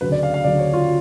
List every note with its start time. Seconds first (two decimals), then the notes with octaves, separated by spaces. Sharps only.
0.01 D2 C#3 F#3 B4
0.12 D5
0.23 F5
0.34 F5
0.44 D2 C#3 F#3 D5
0.59 C#5
0.74 F4